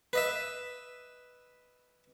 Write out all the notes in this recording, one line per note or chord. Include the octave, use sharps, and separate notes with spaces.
B4 D#5 E5